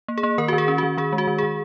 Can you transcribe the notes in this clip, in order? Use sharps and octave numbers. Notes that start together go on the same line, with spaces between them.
A#3
G#4
A#3
D#3 A#4
D#3 F#4
G#4
C#4
D#3 F#4
D#3 G#4
G#3
F#4
D#3
D#3 G#4